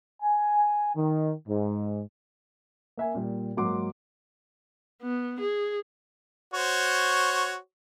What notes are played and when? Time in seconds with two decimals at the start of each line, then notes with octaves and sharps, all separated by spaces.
0.22 G#5
0.95 D#3
1.48 G#2
2.97 A#3 E5 G#5
3.15 A#2 G3
3.57 G#2 F#3 A#3 F#5 C6 D6
5.03 B3
5.40 G#4
6.54 F#4 C5 C#5